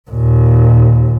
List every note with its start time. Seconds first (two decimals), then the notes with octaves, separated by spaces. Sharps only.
0.10 D#2 A#2